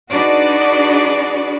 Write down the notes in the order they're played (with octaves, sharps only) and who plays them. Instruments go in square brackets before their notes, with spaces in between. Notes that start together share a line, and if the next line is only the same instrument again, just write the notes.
[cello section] D4 D#4 F#4 G#4 B4 D5